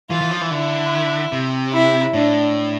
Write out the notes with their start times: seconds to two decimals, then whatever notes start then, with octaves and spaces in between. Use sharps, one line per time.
0.10 E3 F4
0.21 E3
0.31 F3
0.41 E3
0.51 D3 E4
1.32 C3
1.73 E4
2.13 A2 D4